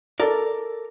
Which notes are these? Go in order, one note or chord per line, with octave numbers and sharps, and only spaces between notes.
A4 A#4 D5